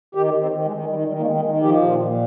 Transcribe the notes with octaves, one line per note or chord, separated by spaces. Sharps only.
D#3 G4
D#3
C4
D#3
G#3
D#3
D#3 G3
D#3 G3
A#3
D#3 G#3
D#3 G#3
F3 G4
A#2
F4
A#2